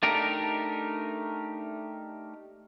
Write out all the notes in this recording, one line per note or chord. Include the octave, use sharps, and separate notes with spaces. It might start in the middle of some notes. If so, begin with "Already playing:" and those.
A3 D4 D#4 G4 A#4